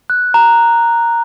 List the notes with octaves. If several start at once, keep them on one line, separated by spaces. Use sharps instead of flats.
F#6
A#5